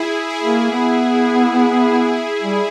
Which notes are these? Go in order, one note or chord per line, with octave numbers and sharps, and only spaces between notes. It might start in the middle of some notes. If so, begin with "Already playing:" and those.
Already playing: E4 G#4
E4 G#4
A#3
B3
G3